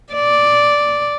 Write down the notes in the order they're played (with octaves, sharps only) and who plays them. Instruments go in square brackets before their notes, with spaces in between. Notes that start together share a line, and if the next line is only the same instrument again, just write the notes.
[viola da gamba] D5